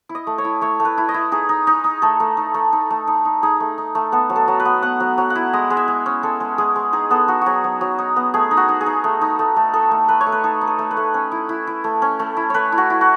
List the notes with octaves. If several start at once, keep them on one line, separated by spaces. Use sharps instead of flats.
E4
D#5
A3
C#5
E4
A3 C#5
A3
B4
E4
D#5
E4
D#4 G#4
D#4
D#4
D#4
A3 A4
A3
D#4
A3
D#4
A3
D#4
D#4
D#4 G#4
A3
D#4
A3
B3 A4
F#3
A4
F#3
B4
B3
B3 F#5
F#3
F#3
F#5
E4
G#3 D#5
G#3
E5
G#3
C#4
G#3 A4
G#3
G#3 G#4
G#3
D#4 G#4
B3 A4
D#4 F#4
F#3 F#4 G#4
F#3
F#3
D#4
B3
A3 G#4
D#4
F#4
D#4
G#4
D#4
A3
D#4
A3
A3
D#4 A4
A3
A3 B4
C#5
A3
B4
D#4 A4
D#4
A4
A3
B4
A3
C#4
E4
E4
E4
A3
C#4
A3
E4
A3 B4 C#5
E4
F#4
E4
F#4